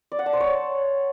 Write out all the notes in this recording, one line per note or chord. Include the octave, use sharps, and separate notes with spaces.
D5
F#5
A5
C5
C#5